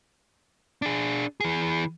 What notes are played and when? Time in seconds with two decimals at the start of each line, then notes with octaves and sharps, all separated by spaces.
0.82 D4 G#4
1.40 E3 G#4